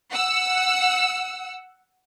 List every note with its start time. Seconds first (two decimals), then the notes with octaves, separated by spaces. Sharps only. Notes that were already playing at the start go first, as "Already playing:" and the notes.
0.12 F#5 E6